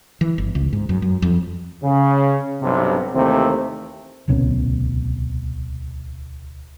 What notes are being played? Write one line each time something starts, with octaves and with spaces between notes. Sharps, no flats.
E3
G1
C#2
G#2
F#2
F#2
F2
C#3
B1 G2 C3
D#2 C3 E3 A3 C4
D1 C2 B2 C#4